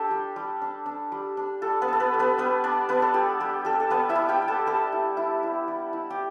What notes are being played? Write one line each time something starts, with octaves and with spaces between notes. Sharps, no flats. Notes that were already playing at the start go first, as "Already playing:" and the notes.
Already playing: D4 G4 A4
G3
G3
D4
D4
G3
D4
G3 A4
B3 B4
D4 A4
B3 B4
G3
B3 B4
G3 B3 B4
G3 D4 D5
B3 D4 B4
A4
G3 G4
G3 G4
G3 A4
A4
G3 B3 B4
E4 E5
G3
G4 G5
G3
A4 A5
G3 A4 A5
E4
E4
E4
G3
E4
G4